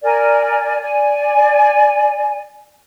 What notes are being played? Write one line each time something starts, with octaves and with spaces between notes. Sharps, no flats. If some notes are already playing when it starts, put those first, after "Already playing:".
A#4 D5 G#5
D5 G#5